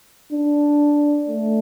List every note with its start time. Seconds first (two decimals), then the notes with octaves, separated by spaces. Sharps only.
0.33 D4
1.29 A3